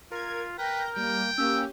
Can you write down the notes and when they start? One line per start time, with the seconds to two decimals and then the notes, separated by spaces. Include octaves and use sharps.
0.11 F4 A#4 G#6
0.58 A#4 B4 G5 G6 A#6
0.96 G3 A#3 G5
1.38 A#3 C#4 G4 E6